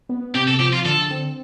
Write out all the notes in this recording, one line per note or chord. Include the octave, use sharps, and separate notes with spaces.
B3
C3 G4
A4
F3 G4
F4
D3 A4
C4